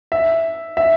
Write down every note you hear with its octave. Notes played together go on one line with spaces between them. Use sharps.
E5
E5